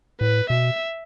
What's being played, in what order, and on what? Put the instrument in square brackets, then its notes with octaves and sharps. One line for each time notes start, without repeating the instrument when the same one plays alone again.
[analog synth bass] A2 [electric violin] B4
[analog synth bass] B2 [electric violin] E5